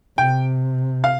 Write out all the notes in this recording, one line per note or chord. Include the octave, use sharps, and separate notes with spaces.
C3 G5
F5